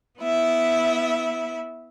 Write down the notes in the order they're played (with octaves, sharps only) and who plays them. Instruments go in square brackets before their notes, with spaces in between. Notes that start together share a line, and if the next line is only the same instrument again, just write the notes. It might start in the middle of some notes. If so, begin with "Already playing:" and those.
[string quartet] B3 E4 E5